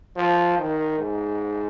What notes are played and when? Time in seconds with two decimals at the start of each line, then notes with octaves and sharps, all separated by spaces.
0.16 F3
0.58 D#3
0.99 G#2